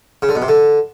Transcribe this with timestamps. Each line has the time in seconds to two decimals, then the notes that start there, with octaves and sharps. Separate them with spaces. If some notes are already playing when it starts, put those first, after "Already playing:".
0.22 C#3
0.29 D3
0.35 B2
0.42 C3
0.48 D3